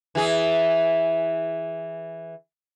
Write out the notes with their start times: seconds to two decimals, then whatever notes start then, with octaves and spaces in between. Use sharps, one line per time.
0.15 E3 G#4